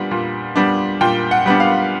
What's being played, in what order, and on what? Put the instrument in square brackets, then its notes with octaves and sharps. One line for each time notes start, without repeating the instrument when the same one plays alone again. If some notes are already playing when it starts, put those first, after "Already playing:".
Already playing: [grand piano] A#2 G3 B3 D4
A#2
G3 B3 D4
A#2 G5
F#5
G3 B3 D4
F5